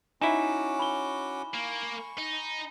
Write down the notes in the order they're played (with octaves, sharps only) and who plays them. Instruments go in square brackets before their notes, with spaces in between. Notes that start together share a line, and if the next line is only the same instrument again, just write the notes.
[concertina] C#4 F#4 D6 [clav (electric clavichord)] D#4 E4 [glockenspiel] G#5 E7
[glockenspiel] B5 G7
[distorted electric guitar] A#3 [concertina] C#6
[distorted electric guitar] D#4